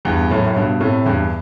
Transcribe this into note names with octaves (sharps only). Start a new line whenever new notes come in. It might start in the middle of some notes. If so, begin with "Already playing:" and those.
E2 G2
F#2 A2
A2
G2 B2
A2 C3
E2 G2